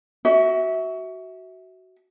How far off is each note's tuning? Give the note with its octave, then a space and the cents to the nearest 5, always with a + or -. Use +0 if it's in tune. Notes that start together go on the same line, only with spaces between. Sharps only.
F#4 +15 E5 -20